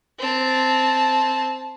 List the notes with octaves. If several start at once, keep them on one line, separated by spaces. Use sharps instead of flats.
C4 A5